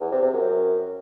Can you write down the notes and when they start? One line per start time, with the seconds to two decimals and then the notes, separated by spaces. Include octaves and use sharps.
0.01 E2
0.11 C3
0.22 C3
0.33 F#2